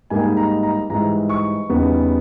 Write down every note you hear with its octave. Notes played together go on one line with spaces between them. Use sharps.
G#2 G3 A#3 D#4 G#5
A#5
A#5
G#2 E3 G3 A#5
C#6
E2 C#3 G3 B3 D#4